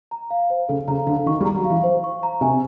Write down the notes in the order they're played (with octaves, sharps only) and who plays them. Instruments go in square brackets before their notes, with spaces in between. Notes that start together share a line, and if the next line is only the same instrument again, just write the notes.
[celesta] A#5
F5
C5
[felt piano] C#3 [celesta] A4
[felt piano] C#3 [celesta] A#5
[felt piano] D3 [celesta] F5
[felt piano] D#3 [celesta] C#6
[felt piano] G3
[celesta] A#5
[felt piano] F#3
[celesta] F5
[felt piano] E3
[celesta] C5
C#6
A#5
[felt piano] C3 [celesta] G#5